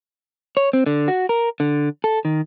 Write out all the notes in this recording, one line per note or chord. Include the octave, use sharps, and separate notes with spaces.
C#5
C4
D3
F#4
A#4
D3
A4
D#3